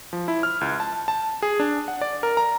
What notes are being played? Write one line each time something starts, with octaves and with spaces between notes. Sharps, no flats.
F3
E4
F6
C#2
A5
A5
G#4
D4
F#5
D5
A#4
A#5